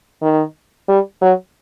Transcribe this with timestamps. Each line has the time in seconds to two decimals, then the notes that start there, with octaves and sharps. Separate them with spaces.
0.22 D#3
0.88 G3
1.22 F#3